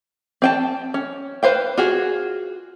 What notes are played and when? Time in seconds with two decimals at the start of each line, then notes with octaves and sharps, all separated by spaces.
0.42 C4 G5 A5
0.94 C#4
1.43 B4 C5 F5 G5
1.78 F4 F#4 G#4